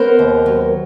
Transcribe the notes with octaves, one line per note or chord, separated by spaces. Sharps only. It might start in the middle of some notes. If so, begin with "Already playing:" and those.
Already playing: B3 A#4 C5
D#2
F#3